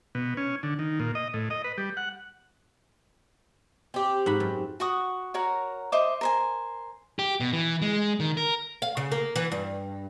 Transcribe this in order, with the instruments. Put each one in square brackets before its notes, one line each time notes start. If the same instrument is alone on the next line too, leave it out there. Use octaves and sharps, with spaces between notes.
[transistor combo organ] B2
C#4
D3
D#3
A#2
D#5
A2
D#5
B4
G3
F#5
[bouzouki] C4 G4
[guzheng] G#2 F#4 B5
F#2
[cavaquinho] F#4 F#5 C#6 D#6
F#4 A#4 C#5 A#5
C5 D#5 E5 D6
A#4 C5 G#5
[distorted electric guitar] G4
B2
E3
G#3
D#3
A#4
[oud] F5
C#3
A#3
E3
G2